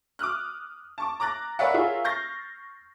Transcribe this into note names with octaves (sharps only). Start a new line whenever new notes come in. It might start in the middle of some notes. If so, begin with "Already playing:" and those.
D6 D#6 F6 F#6
A5 C#6 D6
A#5 D6 F#6 A6 A#6
A#4 B4 C#5 D5 E5 F#5
F4 G#4 A#4 C#5 E5 F5
C#6 F6 G6 A6 A#6 C7